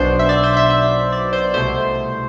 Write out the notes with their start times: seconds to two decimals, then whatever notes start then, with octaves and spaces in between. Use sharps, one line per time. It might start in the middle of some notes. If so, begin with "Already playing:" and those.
Already playing: B1 B2 B3 D4 C5
0.19 E5
0.29 D5
0.44 C5
0.57 E5
0.70 E5
1.12 D5
1.33 C5
1.54 C2 B2 A3 C5